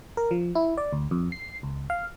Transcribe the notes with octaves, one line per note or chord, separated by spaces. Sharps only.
A#4
F3
E4
D5
D2
F2
C7
C#2
F5